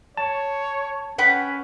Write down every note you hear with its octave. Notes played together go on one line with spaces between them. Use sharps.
C#5 A5
C#4 B4 F#5 G5